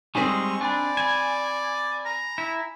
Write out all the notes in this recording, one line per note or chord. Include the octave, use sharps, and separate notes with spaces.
G3 G#3 C4 D#4 G#4 G#5 C#6 B6
D4 D5 G#5 B5
G#5 B5 E7
A#5
E4